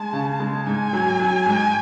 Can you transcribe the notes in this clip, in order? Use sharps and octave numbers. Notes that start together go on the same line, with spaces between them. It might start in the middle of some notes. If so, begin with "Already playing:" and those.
Already playing: G#3 A5
C#3
G#3
G#2 G#5
F#3
F#3
G#2